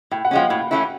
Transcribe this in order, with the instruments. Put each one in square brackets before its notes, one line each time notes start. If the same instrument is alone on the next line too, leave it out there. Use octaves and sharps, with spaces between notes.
[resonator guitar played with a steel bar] A2 [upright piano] G5
[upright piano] F#5
[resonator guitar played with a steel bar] F3 G#3 C#4 [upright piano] F5 G5
[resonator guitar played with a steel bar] A2
E3 A3 C#4 E4